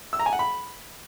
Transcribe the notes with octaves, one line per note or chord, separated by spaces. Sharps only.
E6
A#5
G#5
F#5
B5